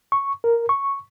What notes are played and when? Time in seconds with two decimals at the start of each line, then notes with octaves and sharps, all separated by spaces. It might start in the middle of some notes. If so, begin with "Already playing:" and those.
0.12 C#6
0.44 A#4
0.69 C#6